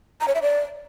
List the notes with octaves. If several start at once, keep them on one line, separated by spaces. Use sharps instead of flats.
A#5
C#5
E5
D5